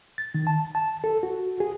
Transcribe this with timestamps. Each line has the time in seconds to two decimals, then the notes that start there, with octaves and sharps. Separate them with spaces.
0.18 A6
0.35 D#3
0.47 A5
0.75 A5
1.04 A4
1.23 F#4
1.60 G#4